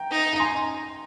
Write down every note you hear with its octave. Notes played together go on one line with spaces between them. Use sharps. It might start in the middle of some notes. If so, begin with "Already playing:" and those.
Already playing: G5 A#5
D#4
A#5
G#5 C6